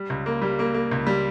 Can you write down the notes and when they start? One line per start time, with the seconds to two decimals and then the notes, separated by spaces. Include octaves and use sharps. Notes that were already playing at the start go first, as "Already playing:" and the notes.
Already playing: G3
0.10 C#2
0.26 A#3
0.42 G3
0.59 A#3
0.74 A#3
0.91 C#2
1.07 G3